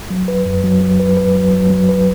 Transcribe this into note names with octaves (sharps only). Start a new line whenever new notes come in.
F#3
B4
F#2
F#3
F#3
B4
B4
F#3
F#3
F#3
B4